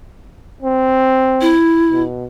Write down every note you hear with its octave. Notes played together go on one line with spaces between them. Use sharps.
C4
E4
B2